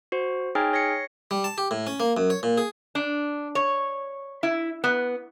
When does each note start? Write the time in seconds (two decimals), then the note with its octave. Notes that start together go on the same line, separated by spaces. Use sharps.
0.12 F#4 C5
0.55 D#4 G#4 C#5 G5 G#5 F6
0.73 C#5 A#6 C7 C#7
1.31 G3
1.44 A5
1.58 G4
1.71 A2
1.87 C#4
2.00 A#3
2.17 F#2
2.30 C#5
2.43 A#2
2.58 G#4
2.95 D4
3.55 C#5
4.43 E4
4.84 B3